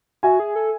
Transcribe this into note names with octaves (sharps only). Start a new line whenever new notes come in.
F#4 E5 G#5
G#4
A4